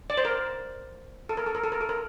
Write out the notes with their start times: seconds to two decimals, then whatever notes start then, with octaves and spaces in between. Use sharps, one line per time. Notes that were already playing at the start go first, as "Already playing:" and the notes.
0.10 D5
0.18 C5
0.25 A#4
1.29 A4
1.37 A#4
1.46 A4
1.55 A#4
1.64 A4
1.72 A#4
1.81 A4
1.89 A#4